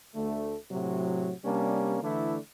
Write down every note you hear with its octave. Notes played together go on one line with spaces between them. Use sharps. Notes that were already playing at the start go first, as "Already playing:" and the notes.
D2 D3 A3
A2 C3 F#3
C3 G3 A#3 C#4 D4
D3 E3 A3 D4 E4